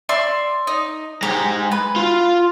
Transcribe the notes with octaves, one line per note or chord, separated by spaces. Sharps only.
D5 E5 C6
D#4
G#3 G4 A#5
B4
F4